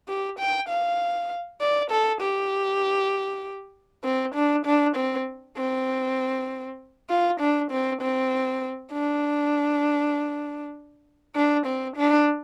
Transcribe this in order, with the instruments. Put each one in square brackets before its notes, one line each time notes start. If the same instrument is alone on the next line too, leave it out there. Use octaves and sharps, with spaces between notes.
[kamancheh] G4
G5
F5
D5
A4
G4
C4
D4
D4
C4
C4
F4
D4
C4
C4
D4
D4
C4
D4